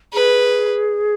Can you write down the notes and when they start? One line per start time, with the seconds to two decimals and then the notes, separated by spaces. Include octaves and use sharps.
0.13 G#4 B4